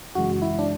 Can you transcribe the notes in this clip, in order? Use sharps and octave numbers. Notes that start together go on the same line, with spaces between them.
F#2 C#3 E3 G#3 F#4
E4
D4